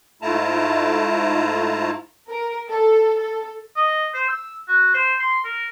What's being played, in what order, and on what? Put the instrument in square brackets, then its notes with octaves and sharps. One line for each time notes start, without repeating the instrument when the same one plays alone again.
[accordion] G#2 A3 E4 F4 A5 A#5
[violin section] A#4
A4
A4
[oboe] D#5
C5
E6
F#4
C5
C6
A#4